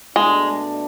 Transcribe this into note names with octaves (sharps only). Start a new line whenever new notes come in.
B2 G#3 A3 D4